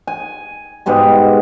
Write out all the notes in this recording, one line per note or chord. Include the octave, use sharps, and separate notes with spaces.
G#5
G#2 B2 G3 G#3